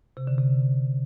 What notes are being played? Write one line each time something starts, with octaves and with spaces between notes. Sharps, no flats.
C3
D3
C3